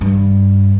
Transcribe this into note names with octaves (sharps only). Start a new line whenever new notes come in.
G2